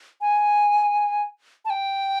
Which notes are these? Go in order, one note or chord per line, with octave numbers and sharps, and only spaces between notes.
G#5
A5
G5